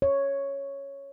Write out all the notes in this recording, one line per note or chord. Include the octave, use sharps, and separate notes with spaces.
C#5